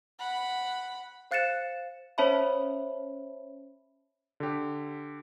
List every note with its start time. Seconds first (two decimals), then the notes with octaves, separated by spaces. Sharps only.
0.19 F#5 B5
1.31 C5 F5 F#6 A6 C#7 E7
2.18 C#4 C5 C#5 E5 A5 B5
4.40 D3 G4